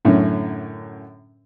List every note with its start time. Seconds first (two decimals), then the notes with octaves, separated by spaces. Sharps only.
0.05 F#2 A2 D3 C#4